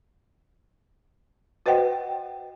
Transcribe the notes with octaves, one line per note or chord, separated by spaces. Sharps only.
F#4 B4 C5 D#5 F#5 G5